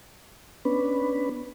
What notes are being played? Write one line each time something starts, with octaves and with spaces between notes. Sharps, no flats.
B3 C#4 D4 B4